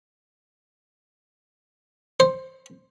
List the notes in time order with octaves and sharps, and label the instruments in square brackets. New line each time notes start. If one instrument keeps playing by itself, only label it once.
[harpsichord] C5